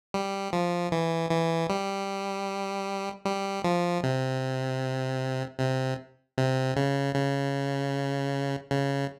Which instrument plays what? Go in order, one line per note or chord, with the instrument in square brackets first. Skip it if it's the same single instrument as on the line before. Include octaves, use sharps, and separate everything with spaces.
[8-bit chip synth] G3
F3
E3
E3
G3
G3
F3
C3
C3
C3
C#3
C#3
C#3